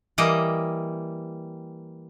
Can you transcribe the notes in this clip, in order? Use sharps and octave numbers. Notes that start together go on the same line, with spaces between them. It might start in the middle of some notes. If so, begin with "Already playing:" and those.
E3 G3 A#3 D#5 G5